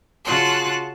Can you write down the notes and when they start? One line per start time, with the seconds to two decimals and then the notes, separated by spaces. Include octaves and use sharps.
0.24 C#3 F4 F#4 A5 C6 F#6